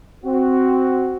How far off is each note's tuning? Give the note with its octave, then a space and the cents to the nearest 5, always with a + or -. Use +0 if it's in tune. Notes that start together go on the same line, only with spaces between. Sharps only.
C4 +0 F#4 +5